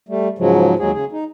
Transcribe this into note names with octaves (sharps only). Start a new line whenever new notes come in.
G3 A3
G#2 C#3 F3 F#3 G#3
D#2 F#3 G#3 G#4
C#3 G#4
D#4